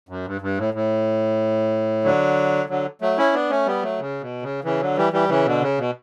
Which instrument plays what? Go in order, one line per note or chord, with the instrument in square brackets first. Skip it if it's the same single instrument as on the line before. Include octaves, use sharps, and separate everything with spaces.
[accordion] F#2
G2
G2
A2
A2
D3 F#3
D3 F#3
F#3 A3
C#4 E4
B3 D4
A3 C#4
G3 B3
F#3 A3
C#3
B2
C#3
C#3 E3
D3 F#3
E3 G3
E3 G3
C#3 E3
B2 D3
C#3
B2